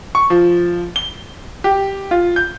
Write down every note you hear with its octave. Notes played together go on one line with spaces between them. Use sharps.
C#6
F3
G7
G4
F4
G6